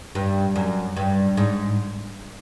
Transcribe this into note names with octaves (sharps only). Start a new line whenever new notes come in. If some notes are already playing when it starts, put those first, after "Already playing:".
G2
F#2
G2
G#2